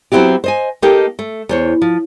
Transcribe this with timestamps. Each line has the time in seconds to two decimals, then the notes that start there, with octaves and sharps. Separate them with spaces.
0.12 F#3 B3 C4 E4 F#4 G4
0.44 C5 D#5 G#5
0.82 A#3 D#4 G4 A4 G5
1.19 A3
1.49 E2 C5 C#5
1.82 F3